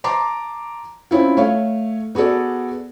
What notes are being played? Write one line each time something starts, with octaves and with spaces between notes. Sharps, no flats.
A5 A#5 C6 D6
C4 C#4 E4 F4
A3 C#5 F5
B3 F#4 G#4 A4 D5